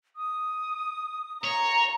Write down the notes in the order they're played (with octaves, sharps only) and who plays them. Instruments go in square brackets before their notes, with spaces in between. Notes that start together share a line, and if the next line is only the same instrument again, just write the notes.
[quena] D#6
[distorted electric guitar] C#5 [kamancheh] A#5